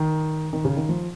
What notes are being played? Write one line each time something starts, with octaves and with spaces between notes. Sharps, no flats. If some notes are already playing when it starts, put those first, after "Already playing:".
Already playing: D#3
D#3
C#3
D#3
F3